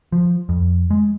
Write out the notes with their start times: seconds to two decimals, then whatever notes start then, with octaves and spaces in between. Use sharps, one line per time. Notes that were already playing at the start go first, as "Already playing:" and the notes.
0.12 F3
0.49 F2
0.91 G#3